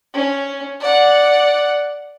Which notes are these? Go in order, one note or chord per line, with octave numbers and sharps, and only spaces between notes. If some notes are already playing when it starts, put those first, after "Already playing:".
C#4
D5 F#5